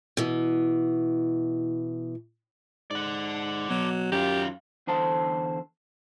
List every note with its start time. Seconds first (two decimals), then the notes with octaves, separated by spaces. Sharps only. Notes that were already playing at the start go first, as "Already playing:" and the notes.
0.17 B2 E3
2.91 G#2 D5 F#5
3.70 B2 F#3
4.12 F#2 D#3 F4 G4
4.87 E2 D3 C5 A5